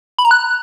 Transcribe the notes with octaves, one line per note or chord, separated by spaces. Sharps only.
B5
A#5
F#6